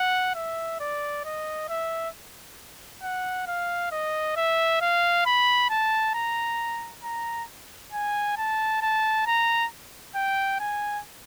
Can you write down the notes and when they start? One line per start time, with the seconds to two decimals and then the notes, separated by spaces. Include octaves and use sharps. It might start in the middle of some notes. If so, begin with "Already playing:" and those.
Already playing: F#5
0.35 E5
0.80 D5
1.25 D#5
1.69 E5
3.03 F#5
3.47 F5
3.91 D#5
4.36 E5
4.81 F5
5.25 B5
5.70 A5
6.14 A#5
7.03 A#5
7.92 G#5
8.37 A5
8.82 A5
9.26 A#5
10.15 G5
10.60 G#5